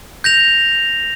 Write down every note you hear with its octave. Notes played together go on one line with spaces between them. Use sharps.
G6 A#6 F7